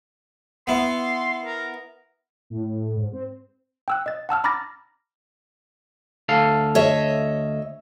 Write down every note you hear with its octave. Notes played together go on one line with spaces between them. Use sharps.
B3 E4 C6
A#4
A2
G#2
C4
G5 E6 F#6
D#5 A6
F#5 A5 E6 F6
A#5 B5 D6 F6 A6 A#6
D2 A4 F5
C#5 D#5 E5